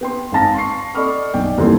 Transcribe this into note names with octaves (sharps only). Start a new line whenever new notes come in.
B3 G5 C6
G#1 F5 A5 A#6
C6 C#6 C7
A4 D5 D#5 B5 C#6 F6
B1 D5 G5
G1 D#2 E3 C4 A4 C6